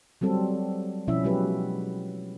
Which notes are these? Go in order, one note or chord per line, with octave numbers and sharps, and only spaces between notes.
F#3 G3 C4 A4
B2 F3 C#4 E4 E5
F#3 G#3 G4 B4